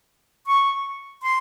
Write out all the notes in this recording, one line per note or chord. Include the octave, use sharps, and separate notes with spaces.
C#6
C6